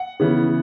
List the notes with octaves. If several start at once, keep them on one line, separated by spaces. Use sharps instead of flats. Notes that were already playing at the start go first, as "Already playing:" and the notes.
Already playing: F#5
C#3 E3 B3